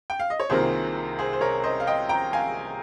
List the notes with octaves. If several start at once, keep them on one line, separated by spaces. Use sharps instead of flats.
G5
F5
D#5
C#5
C2 C3 D#3 A#3 F4 G#4 C5
G#4 C5
C5
A#4 C#5
C5 D#5
F5
D#5 G5
G5 A#5
F5 G#5